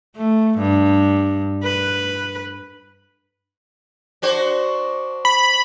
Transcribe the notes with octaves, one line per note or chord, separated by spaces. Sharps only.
A3
G2
B4
D4 F#4 C5
B5